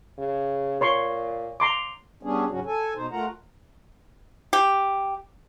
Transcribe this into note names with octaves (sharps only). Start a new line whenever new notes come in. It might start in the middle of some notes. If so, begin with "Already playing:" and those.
C#3
A#2 C#5 C6 C#6
A#5 C6 D6
G3 B3 C#4 D4 G#4
G#2 C#3 F#3 C#4 F#4
A4 G#5
B2 D#4 C5
A3 F4 A#4 F#5 A#5
G4